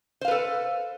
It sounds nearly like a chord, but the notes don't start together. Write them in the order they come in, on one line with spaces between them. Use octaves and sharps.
C5 F5 B4 A4